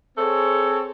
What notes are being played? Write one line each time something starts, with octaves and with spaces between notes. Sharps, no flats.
C4 G#4 A4 C#5